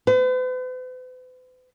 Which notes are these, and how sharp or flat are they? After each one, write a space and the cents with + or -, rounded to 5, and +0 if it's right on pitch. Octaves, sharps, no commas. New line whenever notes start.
B4 +45